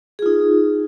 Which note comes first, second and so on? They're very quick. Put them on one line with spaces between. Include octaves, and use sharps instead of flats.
G#4 F4 D#4